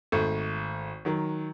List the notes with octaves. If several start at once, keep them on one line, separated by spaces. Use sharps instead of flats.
G#1 A3
D#3 F#3